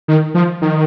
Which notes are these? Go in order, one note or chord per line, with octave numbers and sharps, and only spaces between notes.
D#3
F3
D#3